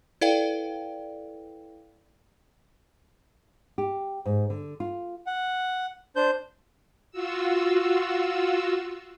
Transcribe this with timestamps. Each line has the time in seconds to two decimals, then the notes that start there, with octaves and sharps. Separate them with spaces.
0.21 E4 A4 B4 D5 F5 G5
3.78 G4
4.26 G#2
4.50 D3
4.80 F4
5.27 F#5
6.16 D4 C5 G6
7.11 F4 F#4 E6